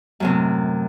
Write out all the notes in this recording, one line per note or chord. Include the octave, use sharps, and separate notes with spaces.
F#2 A2 C3